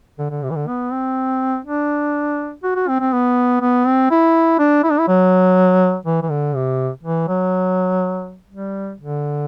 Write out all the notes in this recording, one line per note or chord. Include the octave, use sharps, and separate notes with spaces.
D3
D3
C3
E3
D3
B3
C4
D4
F#4
F#4
C4
C4
B3
B3
C4
E4
D4
E4
D4
E4
F#3
E3
E3
D3
C3
E3
F#3
G3
D3